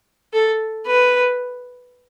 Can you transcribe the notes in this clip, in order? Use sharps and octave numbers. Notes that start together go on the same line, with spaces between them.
A4
B4